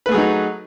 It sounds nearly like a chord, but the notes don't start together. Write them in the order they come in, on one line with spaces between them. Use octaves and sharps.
B4 A3 G#4 F#3 D#4